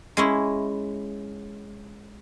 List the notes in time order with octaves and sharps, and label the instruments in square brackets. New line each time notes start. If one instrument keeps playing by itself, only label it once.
[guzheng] G#3 C#4 E4